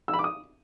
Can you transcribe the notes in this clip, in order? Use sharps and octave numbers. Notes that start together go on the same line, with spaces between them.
E6
B5
D6
D#6